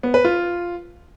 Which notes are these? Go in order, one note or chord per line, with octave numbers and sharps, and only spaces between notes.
B3
B4
F4